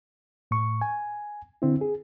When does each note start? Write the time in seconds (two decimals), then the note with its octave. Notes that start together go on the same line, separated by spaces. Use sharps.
0.51 A2 C#6
0.82 G#5
1.62 D3 C4 E4
1.81 G#4